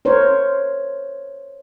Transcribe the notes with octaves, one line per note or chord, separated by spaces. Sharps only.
A#4 C5 C#5